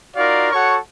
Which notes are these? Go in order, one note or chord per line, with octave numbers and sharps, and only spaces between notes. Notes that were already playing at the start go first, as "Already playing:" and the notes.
D#4 F4 F#4 A#4 D5 F5
F#4 A4 C#5 F#5 C#6